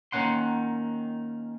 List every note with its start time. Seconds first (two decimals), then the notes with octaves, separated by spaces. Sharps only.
0.12 D#3 A#3 C#4 F#5 C6